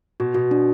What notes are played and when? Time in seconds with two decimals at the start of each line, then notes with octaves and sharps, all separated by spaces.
0.20 B2 F#4
0.34 B2 F#4
0.51 D4